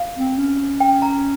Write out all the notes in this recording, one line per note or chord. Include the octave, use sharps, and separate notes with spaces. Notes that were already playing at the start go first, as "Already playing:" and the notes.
Already playing: F5
C4
C#4
G5
A#5